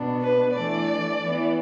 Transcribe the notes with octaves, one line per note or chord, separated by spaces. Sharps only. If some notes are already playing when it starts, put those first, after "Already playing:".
Already playing: B2 B3 D4
B4
E3 A3 D4 D5
E3 B3 E4